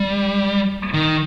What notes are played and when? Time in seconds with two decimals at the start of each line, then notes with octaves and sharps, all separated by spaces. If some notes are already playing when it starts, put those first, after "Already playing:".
Already playing: G3
0.93 D#3